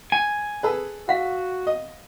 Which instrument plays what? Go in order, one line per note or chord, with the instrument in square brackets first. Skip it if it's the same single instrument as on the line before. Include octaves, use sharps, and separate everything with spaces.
[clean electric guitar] G#5
[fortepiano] G#4 A4 B4
[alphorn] F#4 [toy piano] F5 F#5
[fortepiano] D#5